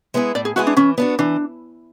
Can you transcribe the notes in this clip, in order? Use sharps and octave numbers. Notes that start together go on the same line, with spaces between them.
G#3 B3 E4 G#4
A2 D5
G#4
G#3 B3 E4 F#4 G#4
D4
E3 C#4
B3 D4 F#4
E3 D4